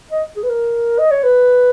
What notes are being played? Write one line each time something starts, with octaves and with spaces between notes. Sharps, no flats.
D#5
G#4
B4
A#4
D#5
C#5
B4